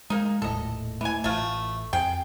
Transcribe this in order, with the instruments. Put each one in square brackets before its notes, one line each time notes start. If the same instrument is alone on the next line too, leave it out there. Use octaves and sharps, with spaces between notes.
[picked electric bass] G#3 [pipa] A#3 D#4
[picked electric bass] D#1 A#1 A2 [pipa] A4 D#5
[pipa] E3 G#5 [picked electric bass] A3
[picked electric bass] A1 [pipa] A3 F4
[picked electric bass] F2 [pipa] G#4 G5